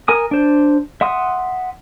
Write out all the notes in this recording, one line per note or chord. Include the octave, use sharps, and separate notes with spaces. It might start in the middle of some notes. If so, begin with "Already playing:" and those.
A#4 G#5 D#6
D4 C5
E5 F#5 C6 D#6